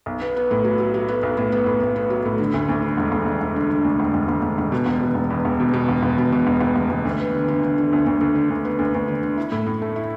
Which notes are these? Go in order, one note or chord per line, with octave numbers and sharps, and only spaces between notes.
B1
B3
B3
A2
F#3
F#3
F#3
B3
B1
A2
B3
A2
A2
B3
F#3
A2
D3
D2
D2
D3
E1
E1
E1
E1
D3
D3
D2
E1
E1
E1
E1
E1
B2
E1
B2
E1
E2
E1
B2
B2
E1
E1
B2
B2
E1
E1
E1
E1
D2
B3
D3
D3
D3
D3
D2
D2
D2
D3
D2
B3
D2
D2
D3
D3
E4
A2
A2
A3
E4